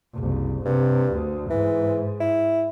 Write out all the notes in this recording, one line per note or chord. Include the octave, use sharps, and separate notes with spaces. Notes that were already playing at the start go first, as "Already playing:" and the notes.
F#1 C2
G2 C3
D2
G#2 E3
E4